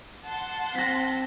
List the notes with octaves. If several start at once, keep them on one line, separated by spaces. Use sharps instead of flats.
F#5 A5 C6
C4 A#6 B6